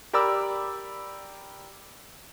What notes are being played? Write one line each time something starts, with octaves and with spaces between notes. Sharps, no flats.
G4 A#4 D5 B5 D6 E6